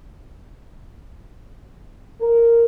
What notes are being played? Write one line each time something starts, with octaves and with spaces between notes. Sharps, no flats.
A#4